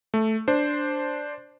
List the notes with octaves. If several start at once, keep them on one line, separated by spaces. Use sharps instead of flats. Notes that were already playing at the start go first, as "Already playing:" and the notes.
A3
D4 C5